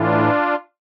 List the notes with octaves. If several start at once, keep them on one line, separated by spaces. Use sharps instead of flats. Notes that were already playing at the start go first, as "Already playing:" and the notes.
Already playing: A2 E3 D4 F4